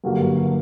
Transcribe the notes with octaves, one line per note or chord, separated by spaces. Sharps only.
G2 D3 F#3 A#3